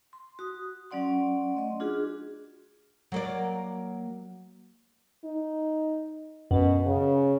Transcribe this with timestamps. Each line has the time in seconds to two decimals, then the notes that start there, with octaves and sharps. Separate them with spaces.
0.13 C6
0.39 F#4 D#6
0.91 F#3 C#4 D5 F#5 C6
1.55 A3 D#5 C6
1.80 D4 F4 F#4 G#4
3.12 F#3 A#3 D5
5.24 D#4
6.51 F#2 B2
6.86 C#3